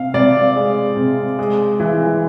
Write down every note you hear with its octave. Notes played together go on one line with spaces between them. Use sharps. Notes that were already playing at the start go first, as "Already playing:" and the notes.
Already playing: C3 F5
C3 D5
G#3
C3
G#3
E3